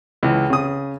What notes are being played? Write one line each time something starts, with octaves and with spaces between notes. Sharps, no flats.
C#2 E3
C#3 D#6